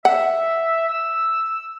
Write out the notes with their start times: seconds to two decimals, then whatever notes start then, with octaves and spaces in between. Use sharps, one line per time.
0.05 E5 F#5
0.88 E6